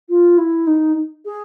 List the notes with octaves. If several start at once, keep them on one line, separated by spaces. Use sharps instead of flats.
F4
E4
D#4
G#4